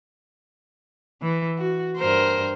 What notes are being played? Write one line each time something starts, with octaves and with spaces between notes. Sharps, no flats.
E3
F#4
G2 A#4 C5